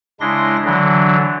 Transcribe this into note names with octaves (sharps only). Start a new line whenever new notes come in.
C#3 G#3 D4 E4 C6 A#6
D3 E3 F#3 D4